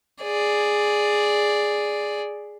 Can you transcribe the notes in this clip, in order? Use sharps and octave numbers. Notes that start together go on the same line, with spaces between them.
G#4 D5